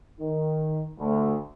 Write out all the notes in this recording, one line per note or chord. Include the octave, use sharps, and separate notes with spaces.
D#3
D2